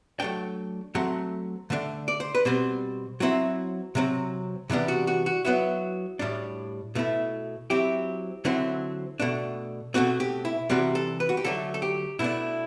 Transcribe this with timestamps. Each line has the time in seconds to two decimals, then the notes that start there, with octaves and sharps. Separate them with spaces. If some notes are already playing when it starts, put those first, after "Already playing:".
0.20 F#3 A3 D4 G5
0.95 F#3 A3 C4 F#5
1.70 D3 A3 D4
2.08 D5
2.20 C5
2.35 B4
2.45 B2 G3 C4 C5
3.20 F#3 C4 E4 F#4
3.95 C3 F#3 C4
4.70 C3 E3 G3 B3 D4
4.88 F#4
5.07 F#4
5.26 F#4
5.45 F#3 B3 E4 F#4
6.19 A2 G3 D4
6.95 B2 A3 E4
7.70 F#3 C4 E4 G4
8.45 D3 F#3 C4 E4
9.20 B2 A3 D4
9.94 B2 A3 C4 F#4
10.20 G4
10.45 E4
10.70 C3 E3 G3 C4 F#4
10.95 A4
11.20 B4
11.29 F#4
11.37 G4
11.44 D3 F#3 A3 A4
11.74 A4
11.82 G4
12.19 B2 A3 D4 E4